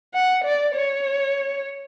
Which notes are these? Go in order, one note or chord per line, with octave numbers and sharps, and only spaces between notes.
F#5
D5
C#5